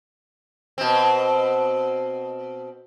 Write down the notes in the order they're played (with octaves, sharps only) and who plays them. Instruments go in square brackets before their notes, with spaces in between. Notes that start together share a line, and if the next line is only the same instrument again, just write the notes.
[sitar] B2 C4